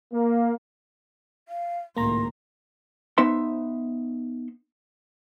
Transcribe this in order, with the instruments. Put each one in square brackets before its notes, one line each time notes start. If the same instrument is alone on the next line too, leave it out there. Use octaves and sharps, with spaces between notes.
[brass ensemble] A#3
[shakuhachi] F5
[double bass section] G#1 C#2 A2 [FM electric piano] A#3 A#5 [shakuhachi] C6
[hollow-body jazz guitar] B3 D#4 C5 E5 C6